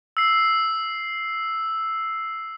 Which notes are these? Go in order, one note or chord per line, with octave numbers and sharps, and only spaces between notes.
E6 C7